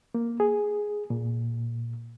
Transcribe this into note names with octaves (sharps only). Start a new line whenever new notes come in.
A#3
G#4
A#2